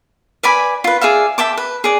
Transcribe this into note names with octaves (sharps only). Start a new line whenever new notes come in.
B4 D5 G#5 B5
F4 B4
G#4 D5 E5 F5
E5 G5 A5 D6
B4
G#4 D5